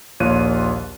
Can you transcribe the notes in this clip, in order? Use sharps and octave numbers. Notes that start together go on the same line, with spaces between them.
A#1 D#2 F4 C#5 F#6 D#7